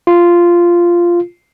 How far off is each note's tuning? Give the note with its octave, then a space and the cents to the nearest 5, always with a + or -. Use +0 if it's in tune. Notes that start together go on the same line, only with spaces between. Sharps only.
F4 -10